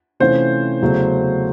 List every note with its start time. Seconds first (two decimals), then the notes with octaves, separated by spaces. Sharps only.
0.20 C3 E3 A3 C#4 F4 C5
0.81 E2 C#3 F#3 A3